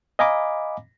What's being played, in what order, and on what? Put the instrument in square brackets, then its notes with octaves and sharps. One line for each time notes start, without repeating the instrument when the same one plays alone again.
[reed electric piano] D#5 F5 G#5 A#5 B5 D6